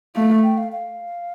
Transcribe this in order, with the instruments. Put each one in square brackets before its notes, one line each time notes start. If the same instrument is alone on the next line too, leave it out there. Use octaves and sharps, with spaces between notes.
[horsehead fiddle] A3 [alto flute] F5
[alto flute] G5
F5
F5